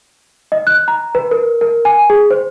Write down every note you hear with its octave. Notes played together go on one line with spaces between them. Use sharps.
D#5
F#6
A#5
B4
A#4
A#4
G#5
G#4
C5